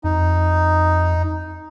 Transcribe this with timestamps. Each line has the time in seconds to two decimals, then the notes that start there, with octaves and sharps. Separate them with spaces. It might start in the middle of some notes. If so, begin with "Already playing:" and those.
0.04 F2 D#4